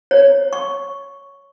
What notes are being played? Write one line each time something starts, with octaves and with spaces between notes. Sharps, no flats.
C#5
C#6